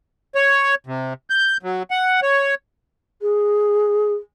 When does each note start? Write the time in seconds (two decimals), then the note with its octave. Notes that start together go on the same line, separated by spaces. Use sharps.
0.35 C#5
0.87 C3
1.30 G6
1.63 F#3
1.91 F#5
2.22 C#5
3.21 G#4